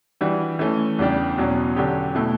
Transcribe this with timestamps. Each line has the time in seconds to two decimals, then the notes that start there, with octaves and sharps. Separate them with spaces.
0.21 E3 G3 D4 F#4
0.59 E3 A3 C#4
0.98 E2 C#3 G3 D4 G4
1.38 E2 B2 F#3 C#4
1.76 D3 F#3 C#4 G4
2.15 B2 A3 E4